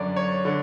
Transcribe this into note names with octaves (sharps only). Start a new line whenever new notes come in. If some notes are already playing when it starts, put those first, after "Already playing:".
Already playing: F#2 D3 C#5 D5
C#5
D3